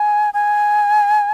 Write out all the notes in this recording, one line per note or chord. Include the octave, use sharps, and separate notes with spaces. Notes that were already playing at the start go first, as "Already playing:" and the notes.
Already playing: G#5
G#5